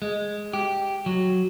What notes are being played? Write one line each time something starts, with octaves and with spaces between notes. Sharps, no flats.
G#3
G4
F#3